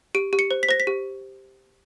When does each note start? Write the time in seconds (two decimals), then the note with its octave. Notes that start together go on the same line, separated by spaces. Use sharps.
0.15 G4 D7
0.33 G4
0.39 C#7
0.51 C5
0.63 B6
0.69 C5 A#6
0.80 B6
0.87 G4